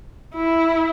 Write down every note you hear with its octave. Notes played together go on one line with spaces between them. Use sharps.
E4